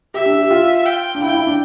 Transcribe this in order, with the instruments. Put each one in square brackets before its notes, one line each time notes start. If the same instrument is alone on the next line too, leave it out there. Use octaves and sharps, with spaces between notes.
[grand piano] G4 [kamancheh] E5
[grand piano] D4
G4
F4
[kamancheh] G5
[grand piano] D4
[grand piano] E4 [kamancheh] G5
[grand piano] E4
D4